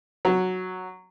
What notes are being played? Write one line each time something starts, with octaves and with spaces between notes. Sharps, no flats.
F#3